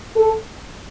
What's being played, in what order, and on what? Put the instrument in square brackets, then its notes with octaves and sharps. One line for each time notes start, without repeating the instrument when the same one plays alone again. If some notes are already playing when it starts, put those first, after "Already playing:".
[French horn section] A4